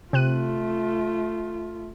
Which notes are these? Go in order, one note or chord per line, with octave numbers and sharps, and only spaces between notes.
C3 A3 F4 F#6 D#7